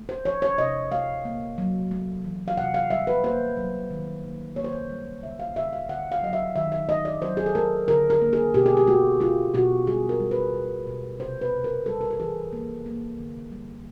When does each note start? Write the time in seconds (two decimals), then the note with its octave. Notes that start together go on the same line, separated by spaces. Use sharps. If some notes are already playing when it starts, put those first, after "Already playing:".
Already playing: A3
0.09 C5
0.25 F3 C#5
0.42 C#5
0.58 C3 D#5
0.92 A3 F5
1.25 A#3
1.58 F#3
1.91 A3
2.24 E3
2.48 F5
2.57 C3 F#5
2.74 F5
2.90 G3 E5
3.07 B4
3.24 A#3 C5
3.57 F#3
3.91 D#3
4.24 A#3
4.56 A#3 C#5
4.64 C5
4.73 C#5
4.90 G3
5.23 C#3 E5
5.40 F5
5.56 C#3 E5
5.73 F5
5.89 D3 F#5
6.12 F5
6.22 F#3 D#5
6.33 E5
6.56 D#3 E5
6.72 E5
6.88 A3 D#5
7.05 D5
7.22 F#3 C5
7.37 G#4
7.46 A4
7.55 A3 A#4
7.88 D3 A#4
8.10 A#4
8.22 A#3
8.33 G#4
8.54 B2 G4
8.66 G#4
8.77 G4
8.87 A3 F#4
9.20 A3 F4
9.54 B2 F#4
9.87 G3 G#4
10.09 A#4
10.20 G3
10.31 B4
10.54 B2
10.87 B2
11.20 C3 C5
11.41 B4
11.53 C3
11.64 A#4
11.86 G3 A4
12.01 A#4
12.10 A4
12.19 E3 G#4
12.53 A#3
12.86 A#3
13.19 D3
13.52 G3